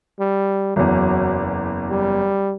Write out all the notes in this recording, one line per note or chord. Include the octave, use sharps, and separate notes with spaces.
G3
F#1 E2 F#3
G3